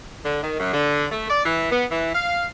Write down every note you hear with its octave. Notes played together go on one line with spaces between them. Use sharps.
D3
D#3
F#2
D3
A3
D5
E3
B3
E3
F5